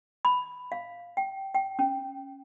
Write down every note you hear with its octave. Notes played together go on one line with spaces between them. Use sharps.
B5
F5
G5
G5
C#4